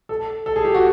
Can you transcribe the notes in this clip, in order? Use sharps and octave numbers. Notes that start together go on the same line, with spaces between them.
A4
A4
G#4
G4
F#4